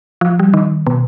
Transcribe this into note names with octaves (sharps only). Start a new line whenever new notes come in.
F3
G3
D#3
B2